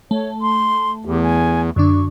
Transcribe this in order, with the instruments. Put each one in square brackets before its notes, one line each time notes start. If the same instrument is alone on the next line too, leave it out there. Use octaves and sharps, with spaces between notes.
[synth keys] A3 [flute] C#5
[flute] C6
[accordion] E2 [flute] G4
[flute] G#5
[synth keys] F#2 D3 D4 [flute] C#6